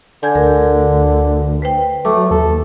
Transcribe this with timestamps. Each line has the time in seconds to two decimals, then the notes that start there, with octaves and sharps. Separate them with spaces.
0.23 D3 G#5 G6 G#6
0.35 D2 A#4
1.62 B4 C5 G5
2.05 F#3 A3 D6
2.31 D#2 A4